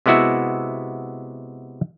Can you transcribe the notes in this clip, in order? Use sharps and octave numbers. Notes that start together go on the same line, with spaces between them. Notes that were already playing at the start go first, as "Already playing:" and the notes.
C3 G#3 B3 E4 F#4 E5